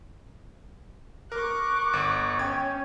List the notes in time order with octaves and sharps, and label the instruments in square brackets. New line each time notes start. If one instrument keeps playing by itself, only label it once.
[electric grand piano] A#4 [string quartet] C#6 D6 F#6
[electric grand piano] G1
[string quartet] C#4 [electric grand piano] G5 G#6